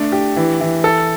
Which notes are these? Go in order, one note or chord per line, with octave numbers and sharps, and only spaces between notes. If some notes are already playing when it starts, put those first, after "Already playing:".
Already playing: A3 D4
G4
E3
E3
A4